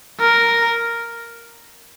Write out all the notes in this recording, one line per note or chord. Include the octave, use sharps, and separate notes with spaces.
A#4